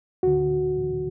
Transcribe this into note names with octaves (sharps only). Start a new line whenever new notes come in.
D2 D3 F#4